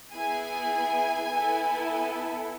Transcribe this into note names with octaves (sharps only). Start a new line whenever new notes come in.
B3 E4 G#4 G#5
B3 E4 A4